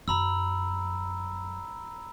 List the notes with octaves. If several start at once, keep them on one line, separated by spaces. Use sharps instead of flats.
F#2 A#5 B5 E6